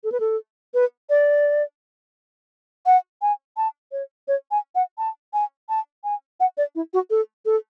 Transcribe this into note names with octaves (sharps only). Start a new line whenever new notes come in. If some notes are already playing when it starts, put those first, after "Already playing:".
A4
B4
A4
B4
D5
F#5
G#5
A5
C#5
C#5
G#5
F#5
A5
G#5
A5
G#5
F#5
D5
E4
F#4
A4
A4